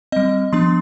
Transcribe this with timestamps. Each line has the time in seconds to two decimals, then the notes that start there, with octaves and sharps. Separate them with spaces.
0.12 G3 C4 D#5
0.52 F3 B3 D4 C6